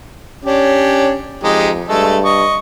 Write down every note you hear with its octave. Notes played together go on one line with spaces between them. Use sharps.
C#4 D4 G4 C#5
F2 G#3 D#4 G4
G2 G#3 A3 A4
D#5 C#6